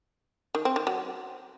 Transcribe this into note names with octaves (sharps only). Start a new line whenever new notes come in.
D#3
C4
D#3
F#3